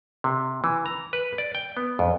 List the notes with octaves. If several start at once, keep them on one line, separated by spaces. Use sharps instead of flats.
C3
E3
A#5
B4
D5
G5
B3
F2